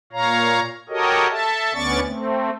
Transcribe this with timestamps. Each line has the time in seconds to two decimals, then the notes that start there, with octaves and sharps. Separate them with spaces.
0.13 A#2 C#5 F5 A#5
0.89 F#4 G4 A4 A#4 C#5 D#5
1.30 A4 E5 A5
1.74 D2 B3 C#4 D5 C#6 A6
2.07 A3 C4